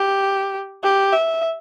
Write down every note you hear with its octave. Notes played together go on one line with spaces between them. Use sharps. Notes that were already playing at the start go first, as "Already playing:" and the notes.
Already playing: G4
G4
E5